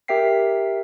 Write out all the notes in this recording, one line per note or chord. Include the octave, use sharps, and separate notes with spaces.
G4 A#4 E5 G5 B6 C7